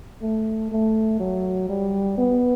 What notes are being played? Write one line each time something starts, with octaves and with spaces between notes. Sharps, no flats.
A3
A3
F#3
G3
B3